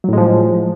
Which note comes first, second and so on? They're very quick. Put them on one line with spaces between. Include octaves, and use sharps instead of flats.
F#3 A2 G#3 F3